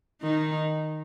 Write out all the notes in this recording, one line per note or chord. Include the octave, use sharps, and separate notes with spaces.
D#3 D#4